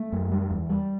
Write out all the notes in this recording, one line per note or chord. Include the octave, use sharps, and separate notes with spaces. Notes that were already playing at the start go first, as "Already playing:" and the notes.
Already playing: A3
F#2
G3
E2
G3